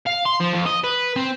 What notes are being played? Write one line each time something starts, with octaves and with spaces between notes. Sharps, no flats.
F5
C6
F3
F2
D#5
B4
C4